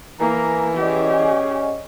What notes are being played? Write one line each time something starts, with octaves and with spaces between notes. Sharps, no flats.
E3 A#3 G#5 A#5
C#4 G4 G#4 D5 D#5 F#5